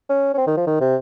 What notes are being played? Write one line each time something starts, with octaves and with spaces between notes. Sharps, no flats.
C#4
C#4
C4
D#3
F3
D#3
C3